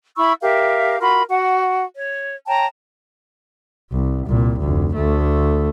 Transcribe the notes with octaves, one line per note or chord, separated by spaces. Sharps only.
E4 B5 C#6 E6
G4 A#4 E5 F5
F4 F#4 A#4 B5
F#4 F#5
C#5
C#5 G5 A5 A#5
C2
C2 A#2
F1 D2
D2 A3